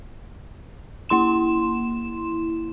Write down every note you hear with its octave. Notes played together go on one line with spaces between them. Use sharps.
A#3 E4 C6 E7